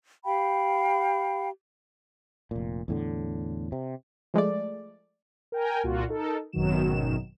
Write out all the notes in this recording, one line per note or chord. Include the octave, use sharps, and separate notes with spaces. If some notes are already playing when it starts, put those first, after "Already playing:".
G4 F5 G5 B5
F1 A#2
E2 A2 D3
C3
F3 G#3 A3 D5
A#4 G5 G#5
C2 A#2 F4 F#4
D#4 A4 A#4
G#1 F#2 B2 D#3 F#3 E7